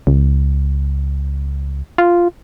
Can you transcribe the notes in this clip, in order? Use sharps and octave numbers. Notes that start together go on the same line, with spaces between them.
C#2
F4